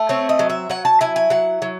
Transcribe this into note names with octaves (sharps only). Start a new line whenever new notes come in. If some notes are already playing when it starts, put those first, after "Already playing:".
Already playing: A3
C4 C#5
D#5
F#3
E5
F#3 F#5
A5
E4 G#5
G#5
F#3 F#5
F#3